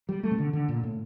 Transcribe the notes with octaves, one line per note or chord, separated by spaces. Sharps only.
G3
A3
C3
D3
D3
A#2
A2